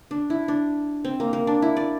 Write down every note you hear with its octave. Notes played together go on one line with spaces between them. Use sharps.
D4
E4
D4
C4
A#3
A#3
D4
E4
D5